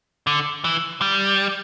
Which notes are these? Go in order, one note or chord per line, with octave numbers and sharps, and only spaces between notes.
D3
E3
G3